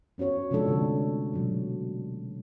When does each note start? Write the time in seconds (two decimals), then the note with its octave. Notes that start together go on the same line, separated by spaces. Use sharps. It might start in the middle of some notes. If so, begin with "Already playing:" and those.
0.18 B3 C#4 F#4 C#5
0.51 C3 F3 G#3 D4 A4
0.66 D3 A3 D4
1.34 B2 F#3